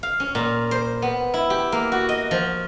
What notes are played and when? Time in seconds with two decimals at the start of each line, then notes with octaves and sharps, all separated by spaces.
0.03 F5
0.20 C#4
0.35 A#2
0.71 C5
1.02 B3
1.34 E4
1.50 G4
1.72 A#3
1.92 F#4
2.09 D#5
2.31 F3